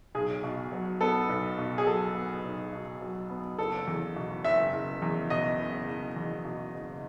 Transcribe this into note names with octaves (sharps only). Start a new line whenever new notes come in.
B1 G#4
B2
F#3
B3 A4
B1
B2
G#4
F#3 A4
B3
B1
B2
F#3
B3
F#1 A4
E2
B2
F#1 E5
F#1
E2
B2 D#5
F#1
F#1
E2
B2
F#1